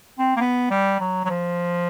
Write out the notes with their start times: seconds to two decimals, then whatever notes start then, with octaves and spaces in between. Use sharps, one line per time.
0.19 C4
0.37 A#3
0.41 B3
0.71 G3
1.00 F#3
1.25 F#3
1.30 F3